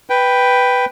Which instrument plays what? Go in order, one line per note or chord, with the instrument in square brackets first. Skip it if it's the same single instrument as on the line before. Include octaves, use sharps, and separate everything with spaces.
[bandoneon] B4 G5